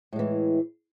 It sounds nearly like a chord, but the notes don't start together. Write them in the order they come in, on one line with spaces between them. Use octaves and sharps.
A2 G#3 E3